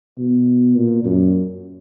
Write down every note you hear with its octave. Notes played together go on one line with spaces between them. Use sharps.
B2
A#2
F#2